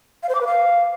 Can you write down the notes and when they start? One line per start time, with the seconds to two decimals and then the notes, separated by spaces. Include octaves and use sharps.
0.23 F5
0.29 C5
0.35 D6
0.41 B4
0.47 F5